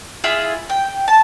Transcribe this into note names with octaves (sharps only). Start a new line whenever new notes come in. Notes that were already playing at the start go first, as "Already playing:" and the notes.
E4 F4 G#4 E5
G5
A5